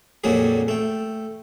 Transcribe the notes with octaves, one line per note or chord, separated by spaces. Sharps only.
F2 A#2 F#3 A#3 G4 G#4
A3 G5